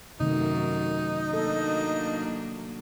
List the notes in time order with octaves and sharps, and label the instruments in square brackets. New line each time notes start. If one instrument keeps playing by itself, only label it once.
[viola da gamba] F#2 [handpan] C3 D#3 A3 [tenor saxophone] D#4
[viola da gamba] F#3 A#3 D4 [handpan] A4